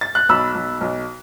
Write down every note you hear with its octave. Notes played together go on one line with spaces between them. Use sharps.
A6
F#6
B1 B5 E6
B1
B1